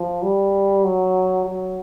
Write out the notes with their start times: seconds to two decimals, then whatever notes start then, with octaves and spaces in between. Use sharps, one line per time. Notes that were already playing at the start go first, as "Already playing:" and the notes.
Already playing: F3
0.22 G3
0.84 F#3
1.45 F#3